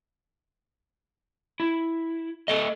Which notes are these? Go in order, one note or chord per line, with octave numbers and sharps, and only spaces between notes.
E4
A3 A4 D#5